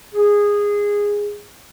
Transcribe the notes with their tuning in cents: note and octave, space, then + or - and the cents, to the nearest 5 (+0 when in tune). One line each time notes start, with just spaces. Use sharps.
G#4 -15